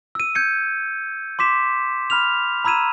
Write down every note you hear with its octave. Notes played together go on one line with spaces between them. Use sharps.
E6 D#7
G6 G#6 C#7
C6 D6 B6 E7
B5 F6 F7
A#5 B5 E6 G#6 D#7 E7